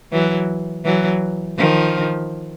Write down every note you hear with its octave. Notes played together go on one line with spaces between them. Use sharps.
E3 F#3
E3 F#3
D#3 F3